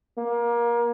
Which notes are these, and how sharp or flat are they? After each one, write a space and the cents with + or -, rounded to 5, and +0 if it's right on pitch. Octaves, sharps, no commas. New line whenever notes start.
A#3 +25